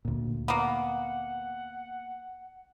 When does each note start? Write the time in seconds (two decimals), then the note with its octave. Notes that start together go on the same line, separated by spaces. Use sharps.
0.05 D2 A#2
0.48 A#3 B3 F#5